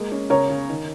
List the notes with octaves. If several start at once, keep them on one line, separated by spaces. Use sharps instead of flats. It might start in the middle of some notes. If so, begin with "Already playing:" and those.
Already playing: G#3 A#3
C#4
C#3 A#4 C#5
C#3
D#3